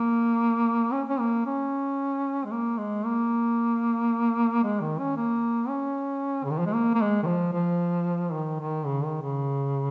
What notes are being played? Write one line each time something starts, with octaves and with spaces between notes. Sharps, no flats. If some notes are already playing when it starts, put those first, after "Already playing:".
Already playing: A#3
C#4
C#4
A#3
C#4
G#3
A#3
G#3
A#3
G#3
D#3
C#4
A#3
C#4
C#3
D#3
F3
G#3
A#3
A#3
G#3
D#3
F3
F3
D#3
D#3
C#3
D#3
C#3